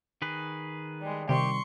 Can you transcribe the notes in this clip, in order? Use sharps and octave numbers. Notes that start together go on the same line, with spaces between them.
D#3 G#4 B4
G3 G#3
C3 D#3 G3 G4 C6 C#6